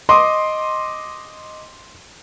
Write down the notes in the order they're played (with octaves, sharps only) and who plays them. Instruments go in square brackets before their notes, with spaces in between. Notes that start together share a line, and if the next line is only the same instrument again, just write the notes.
[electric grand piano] D#5 D6 D#6 [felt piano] C6